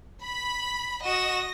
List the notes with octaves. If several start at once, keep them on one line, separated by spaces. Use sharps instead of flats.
B5
F#4 D#5 A#6 E7